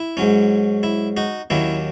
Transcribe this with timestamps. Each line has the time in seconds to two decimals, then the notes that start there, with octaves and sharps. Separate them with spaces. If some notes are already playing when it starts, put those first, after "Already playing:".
Already playing: E4
0.17 G#2 F#3 C#4
0.83 E4
1.17 D#4 F#4
1.50 D#2 D#3 F#3 A#3 C#4 E4